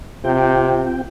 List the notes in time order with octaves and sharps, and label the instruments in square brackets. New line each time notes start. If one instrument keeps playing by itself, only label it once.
[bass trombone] C3 [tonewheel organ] C4 F4 G5